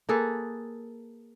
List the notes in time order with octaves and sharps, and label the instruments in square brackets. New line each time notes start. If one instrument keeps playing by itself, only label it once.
[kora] A#3 G#4 A4 B4